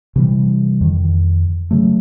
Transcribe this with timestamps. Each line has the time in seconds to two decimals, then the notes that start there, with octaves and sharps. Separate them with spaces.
0.16 C3 E3 G3
0.81 F2 D#3
1.71 C#3 F#3 A3